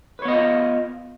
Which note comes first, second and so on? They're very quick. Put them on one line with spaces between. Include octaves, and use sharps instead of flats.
B4 C#5 B3 D#5 F4